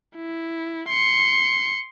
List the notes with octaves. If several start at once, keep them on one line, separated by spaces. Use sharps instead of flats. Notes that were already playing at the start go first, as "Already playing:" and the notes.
E4
C6 C#7